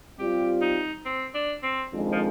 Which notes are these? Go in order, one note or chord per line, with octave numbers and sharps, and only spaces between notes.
G3 C4 F4 G4
D#4
C4
D4
C4
F2 D#3 G#3 D4
F3